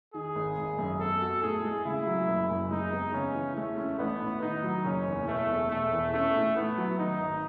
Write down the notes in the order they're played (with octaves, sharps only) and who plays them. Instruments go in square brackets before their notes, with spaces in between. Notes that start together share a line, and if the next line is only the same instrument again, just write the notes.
[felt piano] D#3 [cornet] G#4
[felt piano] G#1
G#1
F#2
[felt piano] B3 [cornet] A4
[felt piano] F#4
[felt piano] A2 [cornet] G#4
[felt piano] G#3
[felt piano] C#3 [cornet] E4
[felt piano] F#3
F#1
F#2
[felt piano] G#3 [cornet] D#4
[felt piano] B3
[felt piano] C#3 [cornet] C#4
[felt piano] E3
[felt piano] G#3 [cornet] A3
[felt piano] C#4
[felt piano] A1 [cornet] B3
[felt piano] A2
[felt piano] D#3 [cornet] D#4
[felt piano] F#3
[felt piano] F#1 [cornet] C#4
[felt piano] E2
[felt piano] B2 [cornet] A3
[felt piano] E1
[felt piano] E1 [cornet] A3
[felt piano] E2
[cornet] A3 [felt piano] C#4
[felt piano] A2
[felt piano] A2 [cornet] B3
[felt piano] F#3
[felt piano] D#3 [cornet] D#4
[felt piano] G#1